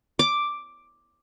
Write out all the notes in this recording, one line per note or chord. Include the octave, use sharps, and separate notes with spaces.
D6